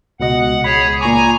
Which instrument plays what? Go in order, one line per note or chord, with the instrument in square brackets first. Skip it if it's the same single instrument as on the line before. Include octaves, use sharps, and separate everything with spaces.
[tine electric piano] C#2 B2 D#5 [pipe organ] F#5
[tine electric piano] C#2 B5 [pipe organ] G#4 C#5
[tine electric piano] A#2 C#6 D6 [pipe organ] G#5 A#5